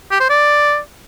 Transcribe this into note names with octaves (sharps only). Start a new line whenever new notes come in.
G4
C5
D5